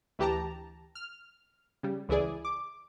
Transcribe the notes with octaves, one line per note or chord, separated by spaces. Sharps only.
D2 E3 G4 A5 A#5
F6
C#3 G3
C#2 E3 E4 G#4 D5
D6